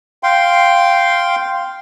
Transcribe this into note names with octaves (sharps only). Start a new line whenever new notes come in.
F5 G5 C6